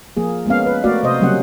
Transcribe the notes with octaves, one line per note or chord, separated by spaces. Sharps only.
F3 A#3 G#4
G#3 A#3 B3 C#4 F5
B4
A3 A#3 F#4 D5 F5
C3 C5 D#5
C#3 F#3 G3 A#3 C#4 F#5